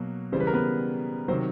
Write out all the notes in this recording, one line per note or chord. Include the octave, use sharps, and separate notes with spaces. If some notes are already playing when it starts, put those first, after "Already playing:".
Already playing: B2 F#3 A#3
C#3 E3 G3 C5
B4
A#4
B3 B4
C3 D#3 F#3 C4 C5